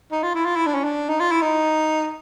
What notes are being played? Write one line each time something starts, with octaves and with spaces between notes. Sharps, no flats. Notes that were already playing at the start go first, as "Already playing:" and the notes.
D#4
F4
E4
F4
E4
D4
C#4
D4
D#4
F4
E4
D#4